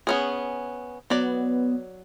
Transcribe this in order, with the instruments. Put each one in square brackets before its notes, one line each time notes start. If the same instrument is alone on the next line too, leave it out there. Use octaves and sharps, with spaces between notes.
[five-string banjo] B3 C#4 G#4
[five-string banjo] F#3 D5 [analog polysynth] B3